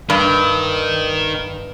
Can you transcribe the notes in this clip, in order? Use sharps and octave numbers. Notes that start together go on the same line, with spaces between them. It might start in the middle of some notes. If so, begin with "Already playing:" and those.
G2 D#3